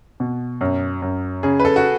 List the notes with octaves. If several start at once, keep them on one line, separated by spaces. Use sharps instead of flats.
B2
F#2
F#2
C#3 G#4
B4
A4
F#4